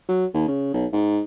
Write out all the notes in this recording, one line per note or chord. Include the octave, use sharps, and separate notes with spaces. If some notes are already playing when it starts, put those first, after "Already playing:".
F#3
D#2
C#3
B1
G#2